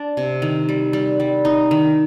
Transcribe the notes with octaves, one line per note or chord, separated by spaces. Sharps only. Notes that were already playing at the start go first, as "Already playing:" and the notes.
Already playing: D4
C3
D#3
G3
G3
G3
D#4
D#3